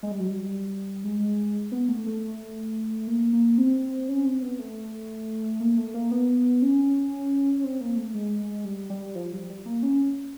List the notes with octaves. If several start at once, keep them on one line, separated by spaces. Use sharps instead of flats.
G#3
G3
F#3
G3
G#3
B3
A3
A3
A#3
A#3
C4
C#4
C4
B3
A3
A#3
A3
A#3
B3
C#4
C4
A#3
A3
G#3
G3
G3
F3
G3
G3
A#3
C#4